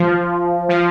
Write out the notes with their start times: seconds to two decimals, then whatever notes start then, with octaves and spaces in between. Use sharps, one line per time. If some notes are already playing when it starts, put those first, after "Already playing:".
Already playing: F3
0.69 F3